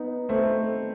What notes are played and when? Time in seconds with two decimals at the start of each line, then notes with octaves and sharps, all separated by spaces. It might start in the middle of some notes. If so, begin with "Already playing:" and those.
Already playing: B3 D#4
0.29 A3 C4